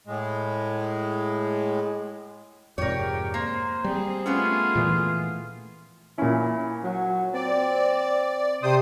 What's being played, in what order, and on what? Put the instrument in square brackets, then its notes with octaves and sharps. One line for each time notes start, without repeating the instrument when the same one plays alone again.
[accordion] A2 G#3
[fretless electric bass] F2 G#2 C3 [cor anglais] G4 [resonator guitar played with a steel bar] A#4 C#5
[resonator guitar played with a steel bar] A#3 [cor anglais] C5
[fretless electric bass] G3 [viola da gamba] C4 G#4
[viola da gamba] A3 G#4 [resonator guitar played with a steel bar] B3 C#4 [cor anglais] F4
[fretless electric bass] A#2 E3 F3
[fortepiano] A#2 C#4 [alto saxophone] E4
[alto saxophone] F#3
[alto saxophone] C4 [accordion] D5
[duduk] C3 [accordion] C5 D#6 [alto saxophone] D5